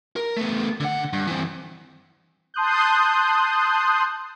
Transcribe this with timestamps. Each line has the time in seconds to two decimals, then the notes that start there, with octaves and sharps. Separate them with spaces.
0.16 A#4
0.37 A3 B3
0.80 D3 F#5
1.13 G2
1.27 E3 C4
2.54 A5 C6 D#6 F#6 G6